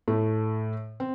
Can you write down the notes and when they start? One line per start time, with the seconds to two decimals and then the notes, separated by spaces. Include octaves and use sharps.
0.08 A2 A3
1.00 C4